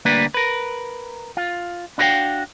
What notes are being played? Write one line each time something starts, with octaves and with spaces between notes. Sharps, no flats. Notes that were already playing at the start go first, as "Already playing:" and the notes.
D2 G3 A#3 D4 B4
A#4 B4
F4
D4 E4 F#4 G4 F5 G5